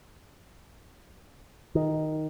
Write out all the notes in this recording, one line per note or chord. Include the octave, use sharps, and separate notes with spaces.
D#3